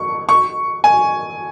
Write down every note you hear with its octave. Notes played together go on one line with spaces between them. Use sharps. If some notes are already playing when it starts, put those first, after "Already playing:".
Already playing: C#6
C#6
G#5